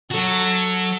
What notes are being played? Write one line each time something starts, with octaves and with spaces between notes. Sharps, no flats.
F#3 F#4 A4